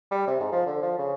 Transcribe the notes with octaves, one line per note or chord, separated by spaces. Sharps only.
G3
C3
G#2
F3
D3
F3
C#3